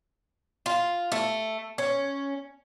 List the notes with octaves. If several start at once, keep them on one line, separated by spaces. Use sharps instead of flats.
F4
A3
C#4